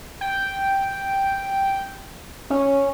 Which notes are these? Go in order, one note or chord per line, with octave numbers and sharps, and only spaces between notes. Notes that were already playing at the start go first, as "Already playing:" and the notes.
G5
C#4